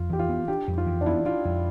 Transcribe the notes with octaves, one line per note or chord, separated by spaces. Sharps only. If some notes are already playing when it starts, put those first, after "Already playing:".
Already playing: F2 F4
E3 G4
F4
B3
D4 G4
F2
F4
E3
D4
B3 E4
D4 F4
F2